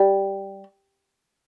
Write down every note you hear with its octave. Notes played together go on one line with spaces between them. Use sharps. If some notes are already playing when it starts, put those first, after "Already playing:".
Already playing: G3